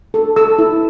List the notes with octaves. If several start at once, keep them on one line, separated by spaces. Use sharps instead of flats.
A4
A4 E6
E4